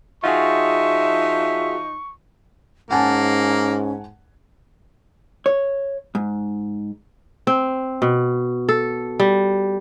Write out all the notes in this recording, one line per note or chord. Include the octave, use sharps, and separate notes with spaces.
F3 D#4 F4 F#4 G#4 E5 C#6
G#2 A#3 C#4 F#5 G#5 A5
C#5
G#2
C4
B2
A4
G3